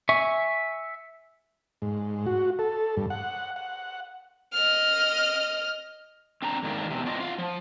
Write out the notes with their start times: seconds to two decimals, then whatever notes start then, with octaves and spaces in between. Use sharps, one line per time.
0.09 E5 G#5 C#6
1.82 G#2
2.26 F#4
2.59 A4
2.97 G2
3.10 F#5
3.56 F#5
4.53 D#5 F6
6.42 C4 D4 A#5
6.63 F2 G#2 D#3 A#3 D4
6.88 E2 C3
7.06 C4 D4 F4 D#5
7.20 F4 F5 F#5
7.38 F3